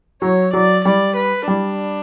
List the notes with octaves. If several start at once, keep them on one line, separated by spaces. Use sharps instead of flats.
F#3 C#5
F#3 D5
G3 D5
B4
G3 D4